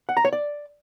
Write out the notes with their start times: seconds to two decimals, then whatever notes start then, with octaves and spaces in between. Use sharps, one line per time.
0.09 F#5
0.17 A#5
0.25 C#5
0.33 D5